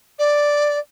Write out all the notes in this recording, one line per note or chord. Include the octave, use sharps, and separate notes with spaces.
D5